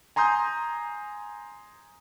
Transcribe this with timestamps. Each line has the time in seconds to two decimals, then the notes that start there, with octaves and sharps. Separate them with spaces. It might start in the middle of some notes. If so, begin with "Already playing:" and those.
0.16 G#5 A#5 C6 D#6 G6